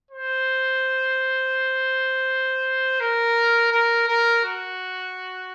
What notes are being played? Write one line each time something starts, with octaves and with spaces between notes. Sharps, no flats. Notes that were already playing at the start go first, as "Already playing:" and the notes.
C5
A#4
A#4
A#4
F#4